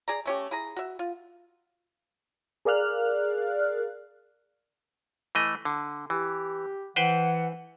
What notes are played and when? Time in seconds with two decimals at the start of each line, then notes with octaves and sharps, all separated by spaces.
0.08 G#4 D5 A#5
0.26 A3 C#4 G4
0.51 E4 G#4 A#5
0.76 F#4 E5
0.99 F4
2.65 G#4 A#4 D5 F5 F6 F#6
5.35 E3 A3 D#5
5.65 D3
6.10 E3 G4
6.96 E3 B4 C5 F#5 G5